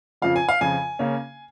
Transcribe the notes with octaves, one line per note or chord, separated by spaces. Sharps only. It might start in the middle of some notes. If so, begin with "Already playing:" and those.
F2 C#3 F3 F5
G#5
F5
F2 C#3 F3 G#5
C#3 A#3 C#4